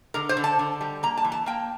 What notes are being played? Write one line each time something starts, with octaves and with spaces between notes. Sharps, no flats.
D3 A#4
C5
D3
A5
D3
G3
A#3 A#5
A5
E3
A5
A#3 G5